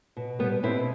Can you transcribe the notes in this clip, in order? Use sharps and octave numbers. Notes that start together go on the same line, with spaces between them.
B2
G3 B3
B2 C4 E4